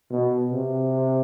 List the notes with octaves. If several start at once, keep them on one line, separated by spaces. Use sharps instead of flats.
B2
C3